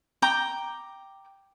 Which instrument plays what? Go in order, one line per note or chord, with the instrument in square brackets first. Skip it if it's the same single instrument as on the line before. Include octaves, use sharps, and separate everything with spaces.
[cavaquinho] G5 A#5 D6